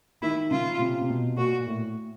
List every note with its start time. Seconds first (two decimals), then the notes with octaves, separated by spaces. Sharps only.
0.22 D#3 E4
0.51 C#3 F4
0.79 C3
1.01 C3
1.09 B2
1.37 A#2 F#4
1.66 A2